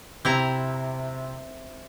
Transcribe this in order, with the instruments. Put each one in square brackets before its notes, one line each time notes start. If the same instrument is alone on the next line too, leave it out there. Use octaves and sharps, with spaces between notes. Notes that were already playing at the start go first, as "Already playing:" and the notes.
[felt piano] C3 G4 [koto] C4 E4 A#5